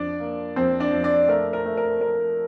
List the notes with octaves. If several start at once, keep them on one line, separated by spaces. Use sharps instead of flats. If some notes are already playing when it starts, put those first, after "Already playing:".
Already playing: F2 D4 D5
A#3
F2 C4 C5
D4 D5
F2
D4 D5
A3 A#4
A#4
A3
A#4
A3 A#4